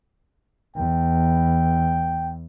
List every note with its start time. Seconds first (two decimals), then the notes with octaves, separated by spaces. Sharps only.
0.76 E2 G5